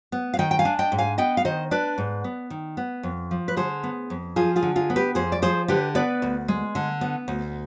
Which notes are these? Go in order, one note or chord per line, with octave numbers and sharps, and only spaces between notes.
B3
F5
D#3 D#5 G5
G5
F5 G#5
D4
D#5 G5
G#2
F5 G#5
B3 D#5 G5
F5
D#3 C5 D#5
D4 B4 D5
G#2
B3
D#3
B3
F2
F3
B4
D3 G#4 C5
B3
F2
F3 F4 G#4
F4 G#4
D3
F4 G#4
B3
G4 B4
F2 G#4 C5
D5
F3 G#4 C5
D3 G4 B4
B3 B4 D5
D2
G#3
D3
B3
D2